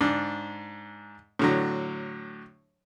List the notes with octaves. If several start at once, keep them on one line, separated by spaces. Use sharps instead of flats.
G#2 D4
A2 D3 F#3